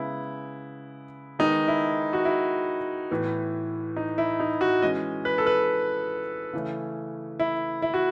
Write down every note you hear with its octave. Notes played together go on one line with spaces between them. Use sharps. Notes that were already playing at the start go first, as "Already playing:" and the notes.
Already playing: C#3 G#3 B3 E4
D#3 G#3 B3 D#4
E4
F#4
E4
A2 E3 B3
D#4
E4
D#4
F#4
E3 G#3 C#4 D#5
B4
A4
B4
C#3 E3 A3 C#4
E4
E4
F#4